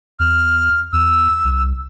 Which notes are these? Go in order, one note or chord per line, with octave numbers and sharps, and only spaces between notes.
E2 F6
E2 E6
C2